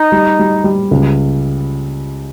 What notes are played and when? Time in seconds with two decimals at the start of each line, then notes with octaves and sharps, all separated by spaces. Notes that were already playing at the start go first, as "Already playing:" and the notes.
Already playing: D#4
0.12 G3
0.39 G3
0.64 G3
0.91 C#2